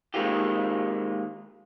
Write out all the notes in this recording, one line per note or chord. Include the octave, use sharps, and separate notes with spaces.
D#3 G#3 A#3 C4 F4 G4